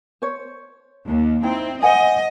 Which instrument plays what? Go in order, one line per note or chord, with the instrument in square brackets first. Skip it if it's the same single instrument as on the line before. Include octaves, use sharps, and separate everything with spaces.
[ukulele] C5 C#5
[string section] D#2
[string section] C4 [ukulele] D#4 E4 G5
[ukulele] C5 F#5 G#5 [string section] D#5